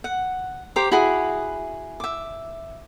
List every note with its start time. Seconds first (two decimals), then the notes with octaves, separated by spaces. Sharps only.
0.04 F#5
0.76 G4 C5 A#5 D6
0.92 E4 F#4 G#4
2.00 E5 D6